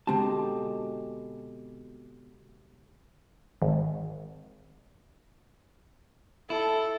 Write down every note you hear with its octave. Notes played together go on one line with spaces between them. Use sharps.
B2 D3 G#3 C4 G4 A5
G#1
E4 A4